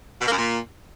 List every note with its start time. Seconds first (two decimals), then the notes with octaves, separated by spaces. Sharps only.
0.21 B2
0.26 A#3
0.32 F#2
0.38 A#2